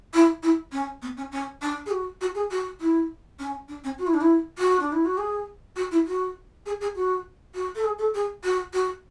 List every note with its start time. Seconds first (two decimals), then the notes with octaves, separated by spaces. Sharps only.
0.14 E4
0.43 E4
0.72 C#4
1.02 B3
1.17 C#4
1.32 C#4
1.62 D4
1.86 G#4
1.91 F#4
2.21 F#4
2.35 G#4
2.51 F#4
2.80 E4
3.39 C#4
3.68 D4
3.84 C#4
3.98 F#4
4.07 E4
4.14 D4
4.21 E4
4.58 F#4
4.80 D4
4.92 E4
5.05 F#4
5.18 G#4
5.76 F#4
5.91 E4
6.07 F#4
6.66 G#4
6.81 G#4
6.95 F#4
7.54 F#4
7.75 A4
7.84 G#4
7.99 A4
8.14 G#4
8.43 F#4
8.73 F#4